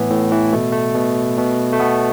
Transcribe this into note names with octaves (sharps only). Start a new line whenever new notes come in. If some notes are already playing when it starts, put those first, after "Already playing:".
Already playing: A2 E3 B3
A2
E3
B2 A3
A3
B2
B2
A3
B2 B3